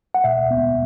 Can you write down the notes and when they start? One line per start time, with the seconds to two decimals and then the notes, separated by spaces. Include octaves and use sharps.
0.14 F#5
0.24 B2 E5
0.51 B3